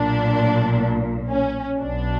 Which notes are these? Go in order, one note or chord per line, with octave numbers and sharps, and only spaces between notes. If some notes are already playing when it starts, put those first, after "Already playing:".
Already playing: B1 A#2 D4
C#4
B1 B2 D4